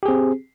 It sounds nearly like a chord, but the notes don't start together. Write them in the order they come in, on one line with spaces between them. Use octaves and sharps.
G4 G#4 C4